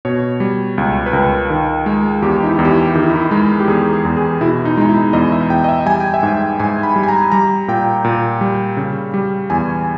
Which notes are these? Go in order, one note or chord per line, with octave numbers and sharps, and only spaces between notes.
B2 C#5
G3
C#2
B4
C#2 A#4
D#3
G#3
E2 G4
D#4
E4
E2
G4
E4
D#3 G4
E4
D#4
E4
G#3
G4
E2 G#4
G#4
E2
G#4
B2 E4
D#4
G#3 D#4
E4
E2 D#5
E5
E2 G5
D#5
E5
G3 G#5
G5
E5
G#2 G5
G#2 G#5
B5
G3
G#5
A#5
G3 A#5
A#2 G5
A#2
G3
C#3
G3
E2 G#5